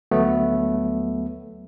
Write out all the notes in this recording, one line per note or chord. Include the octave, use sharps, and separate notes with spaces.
D2 F#3 A3 B3